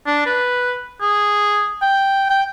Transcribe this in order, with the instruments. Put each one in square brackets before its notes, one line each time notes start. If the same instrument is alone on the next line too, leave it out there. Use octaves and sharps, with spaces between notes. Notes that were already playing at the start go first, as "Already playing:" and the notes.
[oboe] D4
B4
G#4
G5
G5